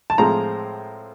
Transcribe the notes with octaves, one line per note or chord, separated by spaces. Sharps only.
A5
A2 F3 G#3 C4 A#5